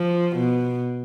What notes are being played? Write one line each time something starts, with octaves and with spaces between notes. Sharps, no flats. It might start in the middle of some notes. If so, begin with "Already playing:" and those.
Already playing: F3
B2